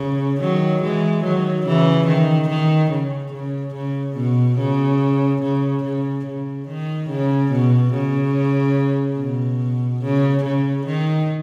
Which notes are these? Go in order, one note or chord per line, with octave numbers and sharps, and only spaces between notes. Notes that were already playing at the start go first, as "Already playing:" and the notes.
Already playing: C#3
D#3 F#3
E3 G#3
D#3 F#3
C#3 E3
D#3
D#3
C#3
C#3
C#3
B2
C#3
C#3
C#3
C#3
D#3
C#3
B2
C#3
B2
C#3
C#3
D#3